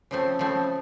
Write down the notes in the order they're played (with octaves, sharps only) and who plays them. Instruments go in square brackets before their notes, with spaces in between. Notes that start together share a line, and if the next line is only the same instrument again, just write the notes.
[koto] C#3 F3 A3 C4
C#3 F3 A3 C4